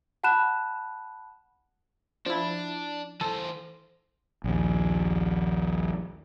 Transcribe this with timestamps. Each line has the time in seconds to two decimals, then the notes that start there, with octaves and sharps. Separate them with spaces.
0.24 F#5 A5 B5 F#6 E7
2.26 F3 D4 E4
3.21 E3 A4 C5
4.44 A#1 D#2